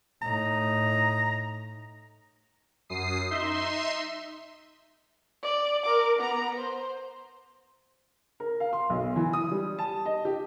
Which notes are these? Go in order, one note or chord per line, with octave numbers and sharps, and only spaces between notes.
A2 D#4 A#5
F#2 D#6 C7
D#4 E5 C6
D5
A#4 D6
B3 A#5
C5
A#4
F5
C6
B1
E3
D#6
G3
A5
D#5
G4